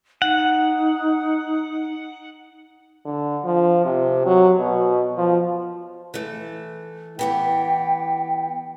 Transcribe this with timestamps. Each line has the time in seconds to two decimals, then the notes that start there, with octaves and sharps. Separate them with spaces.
0.22 D#4 F#5
3.05 D3
3.44 F3
3.85 C3
4.26 F#3
4.59 B2
5.17 F3
6.14 E3 A3
7.19 E3 B3 G4 G5